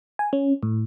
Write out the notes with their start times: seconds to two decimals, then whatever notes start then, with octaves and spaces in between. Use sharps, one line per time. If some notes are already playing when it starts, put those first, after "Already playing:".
0.19 G#5
0.33 C#4
0.63 A2